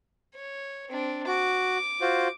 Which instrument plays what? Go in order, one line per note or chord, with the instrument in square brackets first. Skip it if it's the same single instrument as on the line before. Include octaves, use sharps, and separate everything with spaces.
[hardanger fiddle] C#5
C4 D4
[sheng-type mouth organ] F#4 [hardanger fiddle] D6
[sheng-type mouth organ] F4 F#4 C5